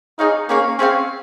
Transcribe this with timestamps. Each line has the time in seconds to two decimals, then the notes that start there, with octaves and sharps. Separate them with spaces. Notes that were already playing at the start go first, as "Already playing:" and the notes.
0.19 D#4 G#4 C#5 F5
0.49 A#3 C#4 G#4 C#5 F5
0.78 C4 C#4 G#4 C#5 F5